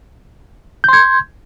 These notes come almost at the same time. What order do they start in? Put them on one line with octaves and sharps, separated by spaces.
G6 C6 G#6